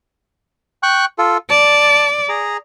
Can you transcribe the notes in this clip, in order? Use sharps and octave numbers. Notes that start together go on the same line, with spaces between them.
G5 C#6 F#6
F4 A4
D5 A5
G#4 A#5